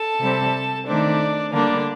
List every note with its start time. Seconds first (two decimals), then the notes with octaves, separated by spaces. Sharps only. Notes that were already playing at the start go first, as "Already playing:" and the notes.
Already playing: A4 A5
0.21 C3 G3 C4
0.86 D#3 A3 C4 D4 D5
1.52 D3 G3 A#3 D4 D5